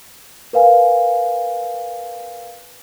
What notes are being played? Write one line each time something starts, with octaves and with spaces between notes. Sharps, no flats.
A#4 B4 F5 G#5